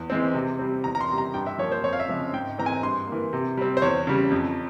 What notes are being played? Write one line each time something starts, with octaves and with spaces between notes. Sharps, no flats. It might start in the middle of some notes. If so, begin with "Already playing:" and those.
Already playing: E2
E3 G#3 C4
C3
G3 C4
E2 A#5
A#5
C6
C3 G3
A#5
G2 G5
E5
F3 A#3 C#5
C5
F2 C#5
F5
E5
C#3 F3 G#3 C4
G#2 G5
E3 G#3 C4 A#5
G#5
G2 C6
E3 A#3
C3
G3 C4
C5
E2 C#5
C#3 G3
F2